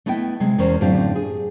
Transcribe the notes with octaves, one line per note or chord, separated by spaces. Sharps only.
A3 B3 E4 D#5 G5
C3 G#3
E2 C#4 A#4 C5
F#2 A2 D3 C4 G4 F5
G#4